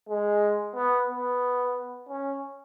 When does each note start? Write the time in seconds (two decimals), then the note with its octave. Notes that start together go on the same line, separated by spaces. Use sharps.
0.09 G#3
0.75 B3
1.09 B3
2.09 C#4